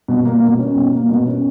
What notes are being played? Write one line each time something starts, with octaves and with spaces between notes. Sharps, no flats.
B2
A#3
B2
C#4
B2
A#3
B2
C#4